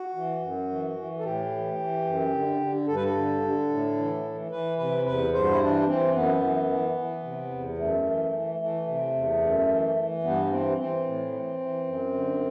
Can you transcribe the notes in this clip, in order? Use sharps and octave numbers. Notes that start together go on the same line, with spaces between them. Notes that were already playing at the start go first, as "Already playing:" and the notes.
Already playing: F#4
E3
F#2
E3
E3
A4
A2 G4
E3
E3
F#2
D3
D3
G2 A4
B4
A4
D3
D3
A2
E3
E3
E3 B4
C3 B4
E2 B4
G2 C5
F#4
E4
E3 D4
E3 C4
F#2 B3
E3
E3
E3
C3
E2
F#2 A3
E3
E3
E3 A3
C3
E2
F#2
E3
E3
G2 B3
E3 C4
E3 C4
A2
E3
E3
F#2
D3